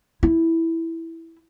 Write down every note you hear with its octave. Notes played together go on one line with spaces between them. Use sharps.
E4